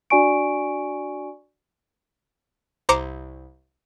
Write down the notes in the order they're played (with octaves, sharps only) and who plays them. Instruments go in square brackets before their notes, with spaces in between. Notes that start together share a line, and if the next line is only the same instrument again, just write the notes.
[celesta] D4 F#4 D5 G#5 C#6 D7
[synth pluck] C2 C5 A#5 D6 C#7